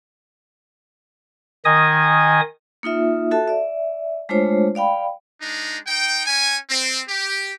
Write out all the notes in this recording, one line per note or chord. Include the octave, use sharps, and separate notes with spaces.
D#3 D#5 G#5 D#6
A#3 D#4 F4 E5
F#4 A4 E5 A5
D5 E5
G#3 A3 D4 F4 C5 C#5
D5 F5 G5 B5
G#3 D4 D#4
D#4 G5
C#4 G#5
C4
G4